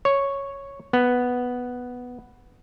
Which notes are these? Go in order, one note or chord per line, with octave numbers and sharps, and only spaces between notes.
C#5
B3